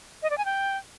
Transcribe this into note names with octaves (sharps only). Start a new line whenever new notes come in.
D#5
D5
G#5
G5